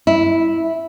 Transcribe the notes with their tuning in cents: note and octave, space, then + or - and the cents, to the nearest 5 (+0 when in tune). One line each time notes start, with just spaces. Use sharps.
E4 -5